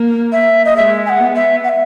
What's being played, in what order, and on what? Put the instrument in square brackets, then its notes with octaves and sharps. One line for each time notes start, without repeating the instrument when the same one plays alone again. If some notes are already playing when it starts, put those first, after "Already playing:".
Already playing: [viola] A#3
[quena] E5
D#5
[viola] G#3 [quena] E5
[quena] G#5
F#5
[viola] B3
[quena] E5
F#5
E5